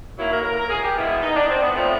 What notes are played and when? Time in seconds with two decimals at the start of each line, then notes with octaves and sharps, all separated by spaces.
0.17 D#3 F#3 A#3 E4
0.31 A#4
0.43 A#4
0.56 A#4
0.70 G#4
0.82 G4
0.95 B2 G#3 B3 E4
1.09 E4
1.22 D#4
1.35 D4
1.48 C4
1.61 B3
1.74 A2 F3 A3 C4